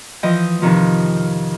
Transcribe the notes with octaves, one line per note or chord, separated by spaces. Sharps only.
E3 F3 D#5 G5 G6
F2 C3 D#3 F3